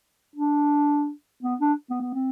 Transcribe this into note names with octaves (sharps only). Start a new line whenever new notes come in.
D4
B3
D4
B3
B3
C4